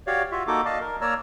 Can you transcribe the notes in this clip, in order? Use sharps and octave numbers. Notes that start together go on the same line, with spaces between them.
F#4 G4 C#5 D5 F5
F4 F#4 E5
A#3 D#4 F#4 A4 D6
D5 D#5 F5 A5
A#4
A#3 C#5 D5 A#5 E6 F6